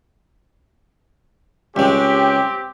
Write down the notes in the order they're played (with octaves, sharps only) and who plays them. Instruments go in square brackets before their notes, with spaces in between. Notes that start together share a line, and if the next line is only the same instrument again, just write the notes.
[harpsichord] C#2 G#3 [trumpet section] C4 G4